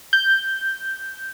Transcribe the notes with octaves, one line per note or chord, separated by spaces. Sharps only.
G6